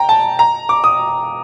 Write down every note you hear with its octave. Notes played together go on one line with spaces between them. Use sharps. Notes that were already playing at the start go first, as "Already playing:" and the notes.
Already playing: G5 A#5
A5
A#5
D6
D#6